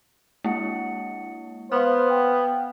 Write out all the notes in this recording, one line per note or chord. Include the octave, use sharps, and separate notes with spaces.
G#3 A#3 D4 E4 F#5 C#7
B3 C5 F5 F#5 F6
G5